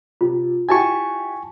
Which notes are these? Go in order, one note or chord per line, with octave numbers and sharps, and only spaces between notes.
C3 F4
E4 F#4 G4 G#5 A5 C#6